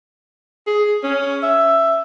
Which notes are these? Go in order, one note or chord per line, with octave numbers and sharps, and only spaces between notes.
G#4
C#4
E5